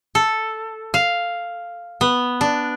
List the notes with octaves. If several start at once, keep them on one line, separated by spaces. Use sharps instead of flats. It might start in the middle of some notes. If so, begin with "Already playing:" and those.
A4
F5
B3
D4